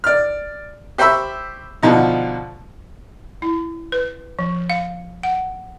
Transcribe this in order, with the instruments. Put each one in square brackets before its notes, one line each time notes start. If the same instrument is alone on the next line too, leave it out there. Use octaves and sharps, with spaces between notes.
[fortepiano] D5 F6
G4 C5 E5 B5 C#6 E6
B2 D3 F3 D#4
[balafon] E4
B4
F3
F5
F#5